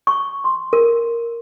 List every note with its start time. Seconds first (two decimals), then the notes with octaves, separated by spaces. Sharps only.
0.07 C#6
0.44 C6
0.73 A#4